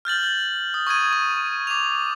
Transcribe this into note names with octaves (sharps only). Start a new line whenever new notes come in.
F6 G6 A6 F#7
D#6
C#6 D#6 G#6 D#7
C#6
D6 F7